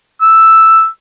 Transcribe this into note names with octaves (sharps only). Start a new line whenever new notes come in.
E6